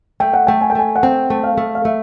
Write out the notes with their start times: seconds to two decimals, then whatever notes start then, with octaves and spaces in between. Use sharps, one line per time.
0.20 A3 G5
0.34 F#5
0.47 A3 G5
0.61 G#5
0.70 G5
0.75 A3 G#5
0.96 F#5
1.03 C4 G5
1.30 A3
1.44 F5
1.58 A3
1.75 F5
1.84 A3 E5